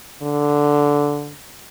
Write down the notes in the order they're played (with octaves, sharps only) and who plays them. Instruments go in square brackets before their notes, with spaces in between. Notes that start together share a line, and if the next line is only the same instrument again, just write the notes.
[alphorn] D3